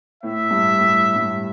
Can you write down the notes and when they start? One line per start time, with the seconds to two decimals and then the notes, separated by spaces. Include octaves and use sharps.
0.23 A2 E5
0.51 G2
0.78 A2
1.15 G2